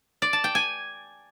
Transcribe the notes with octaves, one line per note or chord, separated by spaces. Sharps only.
D5
A5
G5
G#5